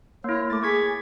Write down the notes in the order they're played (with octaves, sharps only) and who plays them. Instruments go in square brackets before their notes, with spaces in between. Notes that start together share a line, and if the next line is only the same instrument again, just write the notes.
[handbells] A#3 E4 [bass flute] C#5
[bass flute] A3 [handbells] D6 A6
[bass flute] G#4 [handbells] C#6 G#6 B6